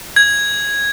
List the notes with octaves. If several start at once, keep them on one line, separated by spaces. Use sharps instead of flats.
G#6